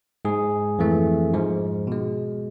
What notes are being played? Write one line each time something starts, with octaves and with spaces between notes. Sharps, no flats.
G#2 G#3 G#4
F2 E3 A3
G#2 F3 G#3
B2 G#3